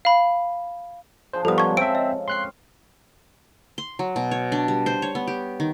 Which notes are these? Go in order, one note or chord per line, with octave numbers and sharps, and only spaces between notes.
F5 B5
F3 D4 G#4 C5
G#2 D3 F3 G3 B3 A4 A#4 D#6
C#3 C#6 G#6
C4 A4 C5 E5 D7
D#5
G#3 C4 C#4 C6 F#6 C7
C6
F#3
B2
C#5
D4
G3
C5
C#5
B3
G4
D#3